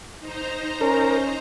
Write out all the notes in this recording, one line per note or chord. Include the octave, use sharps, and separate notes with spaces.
D#4 C5 A#5
C#4 A#4